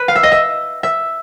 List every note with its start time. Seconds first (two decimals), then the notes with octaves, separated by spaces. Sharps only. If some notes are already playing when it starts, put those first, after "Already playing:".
Already playing: B4
0.08 F5
0.15 E5
0.23 D#5
0.32 E5
0.83 E5